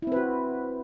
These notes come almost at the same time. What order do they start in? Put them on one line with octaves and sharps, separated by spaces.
E4 C4 B4 F#4